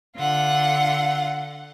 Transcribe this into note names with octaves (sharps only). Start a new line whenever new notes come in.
D3 F4 F#5